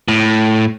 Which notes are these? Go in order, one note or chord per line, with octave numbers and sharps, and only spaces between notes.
A2